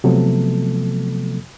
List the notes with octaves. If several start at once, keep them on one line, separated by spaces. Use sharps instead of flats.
C3 F3 F#3 A3 B3 A4